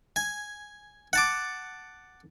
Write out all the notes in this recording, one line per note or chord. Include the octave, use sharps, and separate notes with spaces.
G#5
F#5 A5 D6